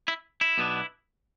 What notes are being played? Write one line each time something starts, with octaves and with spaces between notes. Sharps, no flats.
E4
E4
B1 B2 B3 D4